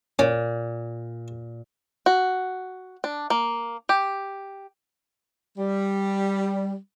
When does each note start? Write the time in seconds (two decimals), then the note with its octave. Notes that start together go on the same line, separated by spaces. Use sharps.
0.19 A#2 C#4
2.06 F#4
3.04 D4
3.30 A#3
3.89 G4
5.58 G3